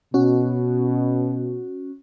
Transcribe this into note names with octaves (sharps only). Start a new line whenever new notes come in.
B2 C#4 F#4